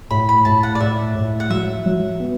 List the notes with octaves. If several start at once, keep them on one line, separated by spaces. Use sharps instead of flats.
A2 B5
B5
A2 A5
F#5
D5
A2 E5
A2
F#5
F#3 E5
F#3
B3